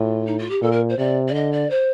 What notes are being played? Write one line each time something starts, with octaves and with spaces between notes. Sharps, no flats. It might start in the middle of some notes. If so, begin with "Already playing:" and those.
Already playing: A2 F4
D#4
F4
G4
A#2 A4
A#4
C5
C3 D5
D5
D3 D#5
D5
C5